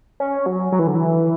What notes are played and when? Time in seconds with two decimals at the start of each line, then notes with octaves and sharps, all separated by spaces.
0.20 C#4
0.46 F#3
0.72 F#3
0.79 E3
0.87 D3
0.95 E3